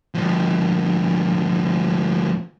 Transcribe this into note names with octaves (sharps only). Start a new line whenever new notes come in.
D2 F3